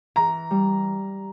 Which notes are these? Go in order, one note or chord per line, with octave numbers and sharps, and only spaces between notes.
E3 A#5
G3